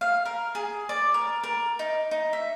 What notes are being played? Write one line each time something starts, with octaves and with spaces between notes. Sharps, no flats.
F5
A#4
G#4
D5
A#4
A#4
D#4
D#4
E5